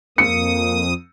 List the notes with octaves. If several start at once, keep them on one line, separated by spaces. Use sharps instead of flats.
F2 A#3 D#6 C#7